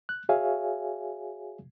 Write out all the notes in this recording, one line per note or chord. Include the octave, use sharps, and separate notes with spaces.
F#6
F#4 G#4 C#5 E5 F5 G#5